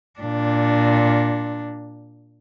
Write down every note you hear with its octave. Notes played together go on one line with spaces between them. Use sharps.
A#2 D4